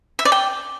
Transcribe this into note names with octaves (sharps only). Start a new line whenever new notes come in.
E5
D5
G5